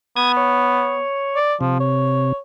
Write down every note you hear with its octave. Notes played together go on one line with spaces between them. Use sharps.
B3 D#6 G#6
C#5
D5
C3 F3
C#5